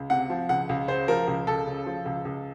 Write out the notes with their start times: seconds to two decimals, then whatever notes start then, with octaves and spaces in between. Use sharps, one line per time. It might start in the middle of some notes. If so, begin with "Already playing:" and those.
Already playing: C#2
0.10 C3 F#5
0.30 F3
0.49 C#2 F#5
0.69 C#2
0.88 C#3 C5
1.08 F3 A#4
1.27 C#2
1.47 C#2 A4
1.67 C#3
1.86 F3
2.06 C#2
2.25 C#2